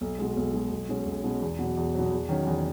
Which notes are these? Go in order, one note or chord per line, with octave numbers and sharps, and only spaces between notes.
B1
B2 G#3
B1
B2 G#3
B1
B2 G#3 C#4
B1
B2 G#3 C#4
E2
B2 F#3
E2
B2 F#3
E2
D#3 F#3 C#4
E2